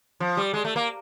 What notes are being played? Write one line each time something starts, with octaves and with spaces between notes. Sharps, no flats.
F3
G3
G#3
A3
A#3